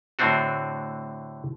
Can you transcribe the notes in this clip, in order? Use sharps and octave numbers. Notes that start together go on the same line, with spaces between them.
A2 D3 C4 D4 F#4